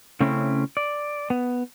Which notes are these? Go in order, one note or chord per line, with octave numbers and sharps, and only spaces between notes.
C#3 A3 C4 C#4 E4
D5
B3